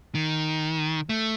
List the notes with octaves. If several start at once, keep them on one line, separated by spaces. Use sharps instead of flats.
D#3
A3